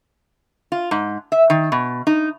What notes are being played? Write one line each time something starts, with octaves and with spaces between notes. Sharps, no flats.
F4
G#2
E5
D#3
B2
D#4